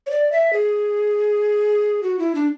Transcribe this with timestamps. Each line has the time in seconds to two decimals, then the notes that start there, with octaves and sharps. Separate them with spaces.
0.07 C#5
0.11 D5
0.32 E5
0.53 G#4
2.03 F#4
2.19 E4
2.35 D4